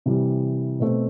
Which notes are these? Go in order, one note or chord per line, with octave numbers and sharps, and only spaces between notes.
C3 E3 G3
B2 A3 C4